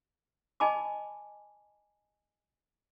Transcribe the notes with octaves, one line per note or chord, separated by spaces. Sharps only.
D#5 G#5 A5 B5 D6